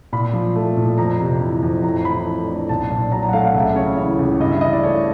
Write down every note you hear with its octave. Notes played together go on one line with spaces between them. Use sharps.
A#2 B5
F3
A3
A#2
F2 A#5
C3
E3
F2
A2 A#5
E3 B5
A3
D4
B1 A5
A#2
F#3 A#5
A#5
F#5
A3 F5
F5
C#2 E5
C#3 C#5
E3 C#5
C#2
G2 D#5
E5
E3 D#5
D5
A3 C#5